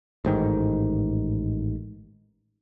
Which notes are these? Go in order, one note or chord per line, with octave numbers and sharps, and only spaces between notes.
A1 G#2 D#3